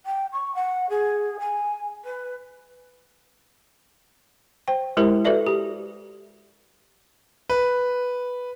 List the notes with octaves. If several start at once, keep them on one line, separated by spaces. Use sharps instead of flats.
G5
C#6
F#5
G#4
G#5
B4
C5 G5
G#3 E4 G4 A#4 C5
F#4 A4 B4 D5 E5
G4
B4